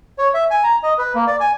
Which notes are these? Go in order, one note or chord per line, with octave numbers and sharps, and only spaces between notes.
C#5
E5
G#5
A#5
D#5
B4
A#3
D5
G#5